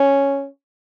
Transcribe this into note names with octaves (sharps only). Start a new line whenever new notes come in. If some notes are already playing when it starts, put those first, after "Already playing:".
Already playing: C#4